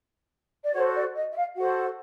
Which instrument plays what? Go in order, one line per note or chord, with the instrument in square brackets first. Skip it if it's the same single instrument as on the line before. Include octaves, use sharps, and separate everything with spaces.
[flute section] D5
F#4 A4 C5 C#5
D5
D#5
E5
F5
F#4 A4 C5 F#5